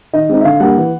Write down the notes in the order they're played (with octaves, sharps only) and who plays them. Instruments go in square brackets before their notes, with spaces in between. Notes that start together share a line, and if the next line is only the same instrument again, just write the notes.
[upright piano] D#3 D#5
G#3 C4 D#4
E5
D3 F5
G3 A#3 D4 F#5
E3